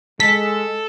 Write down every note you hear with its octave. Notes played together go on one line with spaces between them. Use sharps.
G#3 A4 B6